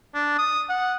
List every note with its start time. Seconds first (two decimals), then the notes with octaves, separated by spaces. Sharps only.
0.14 D4
0.38 D#6
0.69 F#5